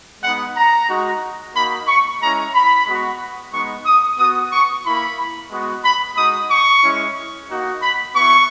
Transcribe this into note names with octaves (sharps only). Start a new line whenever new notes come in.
G#3 B3 D#4 F#5
A#5
G#3 D#4 F#4
A#3 D#4 F#4 B5
C#6
G#3 C#4 E4 A#5
B5
G#3 B3 F#4
G#3 B3 D#4 C#6
D#6
B3 F#4 D#6
C#6
A#3 E4 B5
G#3 B3 F#4
B5
G#3 D#4 F#4 D#6
C#6
G#3 C#4 E4
A#3 D#4 F#4
B5
B3 E4 C#6